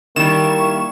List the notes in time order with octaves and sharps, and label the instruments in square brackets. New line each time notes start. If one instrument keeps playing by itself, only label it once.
[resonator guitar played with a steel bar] D#3 G3 [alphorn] A#3 [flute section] E4 C#6 [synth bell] E7